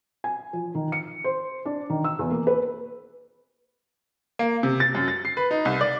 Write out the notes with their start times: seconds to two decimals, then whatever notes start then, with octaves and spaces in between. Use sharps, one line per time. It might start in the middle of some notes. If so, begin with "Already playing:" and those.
0.24 G#5
0.53 F3
0.75 D#3
0.92 C#7
1.24 C5
1.65 D4
1.90 D#3
2.04 E6
2.19 E2
2.31 A#3
2.47 B4
4.39 A#3
4.63 C3
4.80 A6
4.95 F#2
5.08 A6
5.25 C7
5.37 B4
5.51 D#4
5.65 C2
5.81 D5